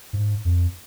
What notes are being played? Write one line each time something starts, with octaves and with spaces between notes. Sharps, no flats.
G#2
F2